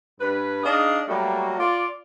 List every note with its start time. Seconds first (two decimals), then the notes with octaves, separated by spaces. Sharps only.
0.20 G2 B4
0.64 D4 D#4 G#4 D#5 F5
1.08 F#3 G3 A3 A#3 F#4
1.59 F4 D5